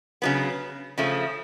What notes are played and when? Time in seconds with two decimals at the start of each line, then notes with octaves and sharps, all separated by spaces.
0.22 C#3 F#3 B3
0.98 C#3 F3 A3